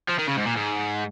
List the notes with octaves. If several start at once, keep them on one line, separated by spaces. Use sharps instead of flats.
F3
D#3
C#3
G#2
A#2
G#2